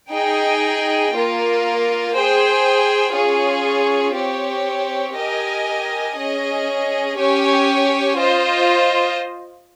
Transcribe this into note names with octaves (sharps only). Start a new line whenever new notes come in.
D#4 G#4 D#5 G5
A#3 F4 A#4
G#4 C5 G5
C#4 F4 G#4 C#5
C4 G4 C#5
G4 A#4 D#5 G#5
C#4 G#4 D#5
C#4 G4 C#5 G#5
F4 C5 D#5